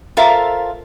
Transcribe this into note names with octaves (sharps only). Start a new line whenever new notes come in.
F4 A4 A#4 C5 E5 F5